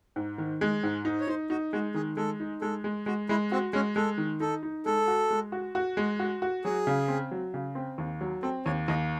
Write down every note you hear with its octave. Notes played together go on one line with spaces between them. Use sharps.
G#2
D#3
G#3
G#2
D#4
C#5
D#4 C5
D#4 F#4
G#3 F#4
D#3 G#4
G#3 A4
D#4
G#3 A4
G#3
G#3 F#4
G#3 E4
C4 F#4
G#3 C#4
G#3 A4
D#3
D#4 A4
D#4
G#3 A4
F#4
G#3
F#4
F#4
G#3
F#4
F#4
F#3 G#4
C#3
C4
F#3
C#3
C4
D#2
F#3
C4 A4
D#2 C#5
D#2 D#5